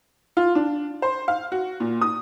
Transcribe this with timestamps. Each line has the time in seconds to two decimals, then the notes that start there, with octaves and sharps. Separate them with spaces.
0.37 F4
0.55 D4
1.02 C5
1.28 F5
1.52 F#4
1.80 A#2
2.01 D#6